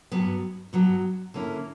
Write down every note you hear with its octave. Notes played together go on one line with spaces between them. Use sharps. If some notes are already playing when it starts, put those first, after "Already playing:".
G2 F#3 B3
G2 F#3 B3
D3 A#3 C#4 E4